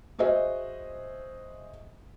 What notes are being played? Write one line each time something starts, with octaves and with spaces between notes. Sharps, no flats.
F#4 G#4 C5 D#5 E5